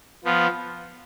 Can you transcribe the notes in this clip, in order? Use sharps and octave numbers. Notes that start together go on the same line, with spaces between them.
F3 B3 F4